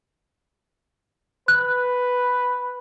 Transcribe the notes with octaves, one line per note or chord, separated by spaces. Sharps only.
B4 F#6